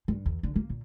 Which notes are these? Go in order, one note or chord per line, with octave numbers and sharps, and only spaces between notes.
G2
E2
D3
A#3
A#2